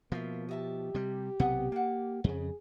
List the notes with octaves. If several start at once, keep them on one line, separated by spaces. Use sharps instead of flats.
B2 F3 A#3 F4 E5
G4 D#5 E5 A5
C3 G3
B1 C3 B3 F#5 D#6
A#3 F#5 A5
F2 C#3 G#4